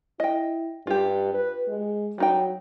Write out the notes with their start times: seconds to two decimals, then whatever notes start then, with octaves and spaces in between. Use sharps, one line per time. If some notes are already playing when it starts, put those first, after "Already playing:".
0.20 E4 D#5 G5
0.87 G2 F4 G4
1.34 B4
1.69 G#3
2.18 F#3 G3 D#4 G5